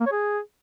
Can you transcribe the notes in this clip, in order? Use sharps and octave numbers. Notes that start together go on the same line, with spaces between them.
A#3
C#5
G#4